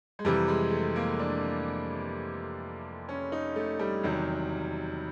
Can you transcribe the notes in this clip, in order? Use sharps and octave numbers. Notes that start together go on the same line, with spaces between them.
G#3
F2 C3 E3 G3
G#3
A3
A#3
D4
C#4
D#4
A3
G3
E2 C3 D#3 F#3